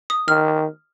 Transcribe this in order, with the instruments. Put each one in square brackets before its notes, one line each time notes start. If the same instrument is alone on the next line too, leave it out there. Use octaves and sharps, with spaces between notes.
[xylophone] D#6
[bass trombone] D#3 [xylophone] F6